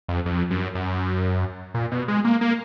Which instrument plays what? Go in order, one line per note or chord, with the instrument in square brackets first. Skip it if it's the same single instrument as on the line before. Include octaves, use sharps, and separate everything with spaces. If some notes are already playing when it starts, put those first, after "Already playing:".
[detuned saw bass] F2
F2
F#2
F#2
A#2
B2
G#3
A#3
A#3